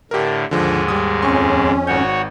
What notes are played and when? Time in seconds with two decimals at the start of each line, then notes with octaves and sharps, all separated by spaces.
0.11 A2 D3 G4 A#4
0.51 D#2 G#2 D3 F3 G#3
0.88 G3 D#6
1.22 F2 C#4 C6 C#6
1.87 G#1 F#4 C#5 G6